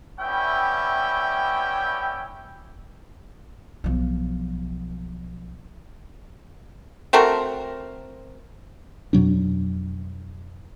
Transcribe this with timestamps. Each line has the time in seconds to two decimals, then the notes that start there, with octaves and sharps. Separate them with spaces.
0.20 G3 B3 C#4 E4 E5 G5
3.84 B1 F3
7.13 A3 C4 F#4 A#4
9.13 F2 B2 F#3 D4